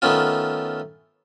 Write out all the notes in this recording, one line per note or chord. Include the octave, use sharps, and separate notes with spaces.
D#3 A3 B3 C#4 F4